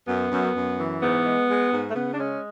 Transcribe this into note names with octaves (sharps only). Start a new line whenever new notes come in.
F#2 B3
F#2
F#2
E3
G#2 B3
G#3
G#3
G#2
A3
C#3 B3
D4
G#3 C#4